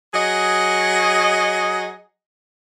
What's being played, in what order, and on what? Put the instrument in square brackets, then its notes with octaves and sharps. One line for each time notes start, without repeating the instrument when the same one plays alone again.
[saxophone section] F#3 G#4 D#5